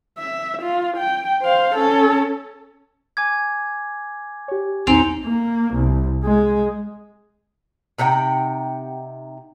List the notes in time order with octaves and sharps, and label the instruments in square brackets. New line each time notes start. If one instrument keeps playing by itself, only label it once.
[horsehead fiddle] E5
F4
G5
C5 F5
C#4 A4
[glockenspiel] G#5 D6 G#6
[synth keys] G4 C#5
[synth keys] A#1 E2 [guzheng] C4 [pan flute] D#4 [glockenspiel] G#5 C6 F7
[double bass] A#3
C2
G#3
[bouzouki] C3 D#4 F#5 G5